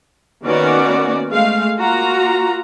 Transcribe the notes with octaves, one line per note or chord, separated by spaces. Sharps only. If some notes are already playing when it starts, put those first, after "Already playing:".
D#3 A#3 B3 C#4 F#4 D5
G#3 A3 F5
A#3 F4 F#4 A#5